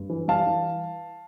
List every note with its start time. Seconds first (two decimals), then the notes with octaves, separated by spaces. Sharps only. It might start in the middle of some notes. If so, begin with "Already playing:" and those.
Already playing: G2
0.10 E3
0.28 G3 F5 A5
0.47 E3